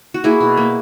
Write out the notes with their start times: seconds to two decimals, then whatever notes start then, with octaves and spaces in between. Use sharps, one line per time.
0.14 F#4
0.24 A#3 E4 G#4
0.40 B2
0.57 A#3